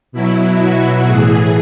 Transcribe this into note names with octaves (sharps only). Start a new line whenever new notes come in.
B2 F#3 E4
F#4
A2 E3 G#4